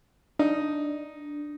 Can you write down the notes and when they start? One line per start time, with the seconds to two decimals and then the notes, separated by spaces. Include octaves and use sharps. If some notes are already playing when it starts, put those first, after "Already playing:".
0.39 D4 D#4